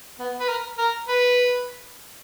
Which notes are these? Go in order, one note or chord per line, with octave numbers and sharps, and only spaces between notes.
B3
B4
A#4
A#4
B4